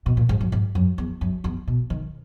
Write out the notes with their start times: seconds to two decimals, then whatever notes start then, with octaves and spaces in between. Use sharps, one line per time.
0.06 B2
0.17 A#2
0.29 G#2
0.41 F#2
0.52 G#2
0.75 F#2
0.98 E2
1.21 F#2
1.44 E2
1.67 B2
1.90 D#3